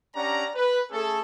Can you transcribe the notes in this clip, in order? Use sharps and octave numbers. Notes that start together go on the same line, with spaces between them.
C#4 D4 G4 D5 F#5 A#5
B4
A3 C#4 G#4 A4